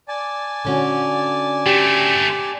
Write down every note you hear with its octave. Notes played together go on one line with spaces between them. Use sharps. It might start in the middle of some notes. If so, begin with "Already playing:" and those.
D5 G#5 A5
D3 C#4 F#4
A3 C4 G4